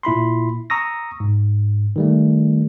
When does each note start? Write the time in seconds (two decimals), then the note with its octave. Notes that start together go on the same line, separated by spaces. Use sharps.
0.03 A#2 E4 B5 C6
0.70 A#5 C#6 D#6 E6 A#6
1.20 G#2
1.96 D#3 G3 A3